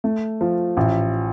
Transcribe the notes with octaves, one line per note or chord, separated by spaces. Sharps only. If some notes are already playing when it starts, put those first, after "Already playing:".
A3
F3
A1